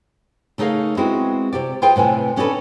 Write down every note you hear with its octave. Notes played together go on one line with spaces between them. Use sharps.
C#3 A3 D#4 G#4 A#4 F5
G#3 B3 C4 E4 F#4 G#4
C3 G4 D5
F4 G#4 B4 C5 G5
A2 C3 B4 G#5
D3 C#4 D#4 G#4 A4 B4